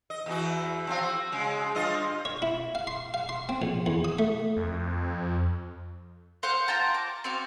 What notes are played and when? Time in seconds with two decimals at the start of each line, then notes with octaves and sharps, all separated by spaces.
0.10 D#5
0.26 E2 E3 F#4
0.87 F3 C4 F4
1.01 F#4
1.32 C#3 G#3
1.75 G2 F4 D#5
2.25 C#5
2.42 E4
2.75 F5
2.87 C6
3.14 F5
3.29 C6
3.49 C4
3.62 A#1
3.86 E2
4.05 D#6
4.19 A3
4.57 F2
6.43 C5 F5 F#5 F#6
6.68 F4 G5 A5 A#5
6.94 D6
7.24 C4 F#4 F5